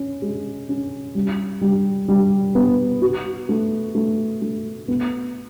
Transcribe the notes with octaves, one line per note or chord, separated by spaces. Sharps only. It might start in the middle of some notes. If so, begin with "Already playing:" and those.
Already playing: C#4
G#3
C#4
G3
G3
G3
B3
F#4
A3
A3
A3
B3